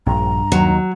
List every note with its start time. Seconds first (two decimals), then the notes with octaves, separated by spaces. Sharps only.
0.07 A#1 G2 A#5
0.52 D#2 D#3 F#3